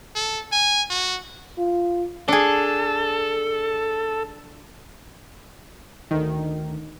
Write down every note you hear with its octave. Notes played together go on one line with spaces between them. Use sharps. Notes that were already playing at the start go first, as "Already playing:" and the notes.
A4
G#5
F#4
F4
D4 G#4 A4
D2 D#3